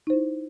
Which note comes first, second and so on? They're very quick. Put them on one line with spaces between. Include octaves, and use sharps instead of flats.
D#4 C5 E4